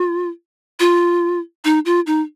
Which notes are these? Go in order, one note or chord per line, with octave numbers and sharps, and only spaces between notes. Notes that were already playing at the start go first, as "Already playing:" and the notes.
Already playing: F4
F4
D#4
F4
D#4